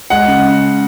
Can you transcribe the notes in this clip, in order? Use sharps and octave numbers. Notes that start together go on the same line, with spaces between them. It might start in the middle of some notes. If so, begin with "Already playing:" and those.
G#3 F#5
C#3